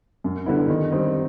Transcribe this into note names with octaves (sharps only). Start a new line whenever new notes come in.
F#2
D3 G3 B3 E4
D#3
G3 C4 D#4